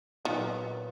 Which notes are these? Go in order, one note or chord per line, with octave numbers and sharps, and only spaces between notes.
A#2 D#3 F#3 B3